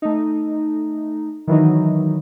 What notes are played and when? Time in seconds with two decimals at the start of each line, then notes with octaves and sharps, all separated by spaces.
0.02 A3 D#4
1.48 D#3 E3 F#3 D#4